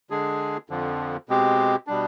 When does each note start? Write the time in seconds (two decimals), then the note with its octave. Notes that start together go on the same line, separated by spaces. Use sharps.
0.10 D3 G#3 D4 G#4
0.69 F2 D3 F3
1.29 B2 G#3 C4 G4
1.87 B2 G3 D4